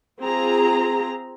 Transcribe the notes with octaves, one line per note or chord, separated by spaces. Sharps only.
C4 F4 G#4 A#5